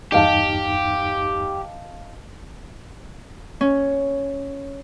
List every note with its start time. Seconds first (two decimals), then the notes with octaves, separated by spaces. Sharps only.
0.12 E2 G2 D#4 G4 D#5 F5 A5
3.61 C#4